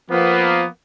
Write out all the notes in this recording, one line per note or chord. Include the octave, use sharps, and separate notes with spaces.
F3 A#3 B3